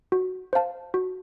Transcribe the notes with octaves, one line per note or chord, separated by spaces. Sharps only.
F#4
C5 F5 A5
F#4